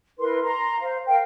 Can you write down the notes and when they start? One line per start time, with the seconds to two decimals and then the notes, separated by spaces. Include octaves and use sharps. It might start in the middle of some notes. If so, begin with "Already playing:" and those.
0.19 E4 A#4 B4 C6
0.43 A#5 C6
0.80 C5 F5
1.07 A#4 F5 G5